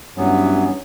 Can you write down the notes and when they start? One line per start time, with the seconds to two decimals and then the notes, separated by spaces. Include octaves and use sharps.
0.18 G2 E3 F#3 B3 C#4